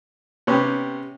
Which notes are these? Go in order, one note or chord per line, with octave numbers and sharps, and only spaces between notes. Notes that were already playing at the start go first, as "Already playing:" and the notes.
C3 B3 C#4 G4